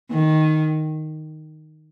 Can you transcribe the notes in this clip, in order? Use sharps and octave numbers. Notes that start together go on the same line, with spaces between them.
D#3